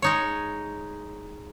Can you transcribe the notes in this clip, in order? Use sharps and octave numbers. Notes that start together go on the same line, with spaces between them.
G#3 D#4 C#5